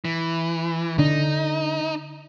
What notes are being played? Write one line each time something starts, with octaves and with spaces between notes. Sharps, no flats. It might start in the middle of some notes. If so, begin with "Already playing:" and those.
E3
D3 D4 D#4